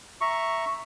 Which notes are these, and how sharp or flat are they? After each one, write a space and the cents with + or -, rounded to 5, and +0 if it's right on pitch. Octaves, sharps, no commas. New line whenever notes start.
E5 +0 A#5 +0 C#6 +0